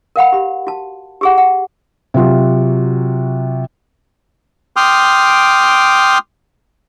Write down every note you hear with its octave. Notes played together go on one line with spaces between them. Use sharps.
A#4 F5 F#5 B5
G4 B5
F#4 A5
G4 G#4 F#5
F#5
C3 F#3 F4 F#4
G5 C6 D6 D#6 F6